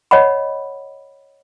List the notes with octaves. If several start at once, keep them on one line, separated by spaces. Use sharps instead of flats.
C#5 D#5 F#5 B5